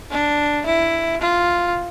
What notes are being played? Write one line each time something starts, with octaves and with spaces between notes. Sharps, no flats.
D4
E4
F4